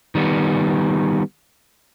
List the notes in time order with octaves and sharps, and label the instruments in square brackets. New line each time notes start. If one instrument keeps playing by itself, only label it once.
[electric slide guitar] D#3 G3 B3